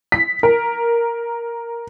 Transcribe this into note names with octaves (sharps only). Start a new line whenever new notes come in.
B6
A#4